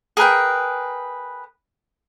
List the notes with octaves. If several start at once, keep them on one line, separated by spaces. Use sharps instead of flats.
G#4 A#4 B4 G5